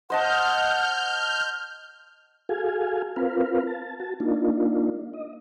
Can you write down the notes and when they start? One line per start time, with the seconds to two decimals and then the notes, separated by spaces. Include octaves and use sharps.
0.10 C5 D#5 F#5 A5 F6 G6
2.49 F#4 G#4 A4 F5 G#5
3.16 C4 F4 A#4 B4 F5
3.67 A5
4.00 F#4 A5
4.20 A#3 D4 D#4 F4
5.13 D#5